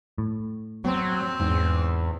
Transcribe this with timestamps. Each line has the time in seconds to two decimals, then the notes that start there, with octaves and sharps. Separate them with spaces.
0.18 A2
0.85 F#3 C4
1.40 E2 G#2